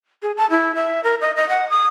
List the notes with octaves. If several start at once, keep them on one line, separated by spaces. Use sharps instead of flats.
G#4
A5
E4
E5
A#4
D#5
D#5
F#5
D#6